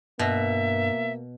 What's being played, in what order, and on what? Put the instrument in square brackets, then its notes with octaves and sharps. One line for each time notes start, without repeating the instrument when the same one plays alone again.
[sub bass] G2 [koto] B2 [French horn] A#3 [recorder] E5